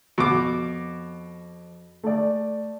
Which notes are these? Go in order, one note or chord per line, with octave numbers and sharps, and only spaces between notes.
F2 B2 D6
A3 D5